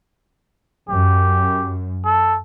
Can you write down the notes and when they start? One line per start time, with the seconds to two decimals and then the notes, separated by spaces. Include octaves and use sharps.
0.89 F#2 G4
2.05 A4